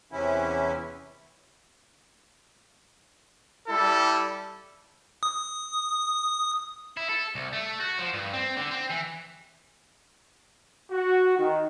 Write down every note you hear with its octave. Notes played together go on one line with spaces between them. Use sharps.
E2 C3 E3 C#4 E4
G3 E4 A4
D#6
E4
A4
C2
A3
F#4
F3
G2
C4
D3
C4
E3
F#4
D#3